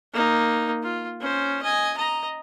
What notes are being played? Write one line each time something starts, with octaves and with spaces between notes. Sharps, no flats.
A#3 D#4
F4
C#4 C5
D#5 G#5
D#5 A#5